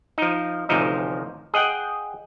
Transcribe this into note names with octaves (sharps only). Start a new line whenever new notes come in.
F3 D#4
A1 D2 C3 F3 D#4
G#4 D#5 F#5 G5